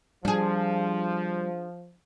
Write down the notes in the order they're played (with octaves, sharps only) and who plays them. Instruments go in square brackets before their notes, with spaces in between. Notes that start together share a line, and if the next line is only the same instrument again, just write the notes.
[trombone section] F3 [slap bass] G3 [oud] D4 G#4